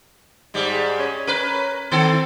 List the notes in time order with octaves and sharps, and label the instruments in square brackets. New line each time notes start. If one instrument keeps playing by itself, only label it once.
[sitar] G#2 G3 G#3
[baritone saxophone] C#4
[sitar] A#4 B4
[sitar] D#3 A4 [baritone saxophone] C4